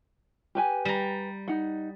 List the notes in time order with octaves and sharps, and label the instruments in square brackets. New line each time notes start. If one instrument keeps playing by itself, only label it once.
[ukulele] G4 B4 G#5
[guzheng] G3 A#5
[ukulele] D#4 F#5